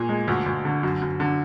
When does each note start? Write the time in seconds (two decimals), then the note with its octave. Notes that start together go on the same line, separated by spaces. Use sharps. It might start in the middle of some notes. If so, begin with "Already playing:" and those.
Already playing: A#2 G#4
0.09 G#3
0.28 D2
0.46 D2
0.65 D3
0.83 F#2
1.02 F#2
1.20 D3